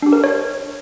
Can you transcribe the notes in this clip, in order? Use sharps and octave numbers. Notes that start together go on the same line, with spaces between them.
D4 G4
A#4
C#5